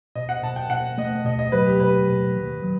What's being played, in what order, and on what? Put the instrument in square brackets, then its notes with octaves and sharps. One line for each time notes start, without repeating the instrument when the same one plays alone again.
[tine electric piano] B2 [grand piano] D#5
[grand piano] F#5
[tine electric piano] B2 [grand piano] A5
[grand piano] G5
[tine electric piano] B2 [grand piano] F#5
[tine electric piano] A3 [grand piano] D#5
[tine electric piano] B2 [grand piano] D#5
[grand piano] D#5
[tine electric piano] F#3 [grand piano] B4
[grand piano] G4
[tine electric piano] B2 [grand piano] B4
[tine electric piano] B2
D#3
F#3